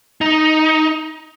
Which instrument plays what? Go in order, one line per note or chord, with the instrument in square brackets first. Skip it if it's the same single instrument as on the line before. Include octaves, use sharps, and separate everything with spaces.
[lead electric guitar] D#4